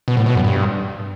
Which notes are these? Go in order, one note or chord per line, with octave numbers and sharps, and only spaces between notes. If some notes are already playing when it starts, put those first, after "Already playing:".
B2
A2
B2
F#2
G2